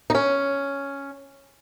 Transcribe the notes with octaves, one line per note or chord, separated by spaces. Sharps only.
D#4
C#4